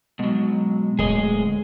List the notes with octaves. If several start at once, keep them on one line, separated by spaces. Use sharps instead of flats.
B2 F#3 G#3
D1 G#4 D#5